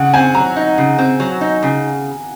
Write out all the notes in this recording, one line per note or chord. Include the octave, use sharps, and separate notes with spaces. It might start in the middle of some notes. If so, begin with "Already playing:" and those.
Already playing: C#3 F#5
C4 G#5
F#3 A#5
D#4
C#3
C4
F#3
D#4
C#3